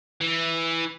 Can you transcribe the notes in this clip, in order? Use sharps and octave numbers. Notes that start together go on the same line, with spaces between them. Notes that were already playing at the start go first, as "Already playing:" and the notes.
E3